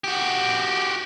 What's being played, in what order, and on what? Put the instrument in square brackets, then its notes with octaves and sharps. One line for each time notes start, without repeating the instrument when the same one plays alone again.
[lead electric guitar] F#4 G4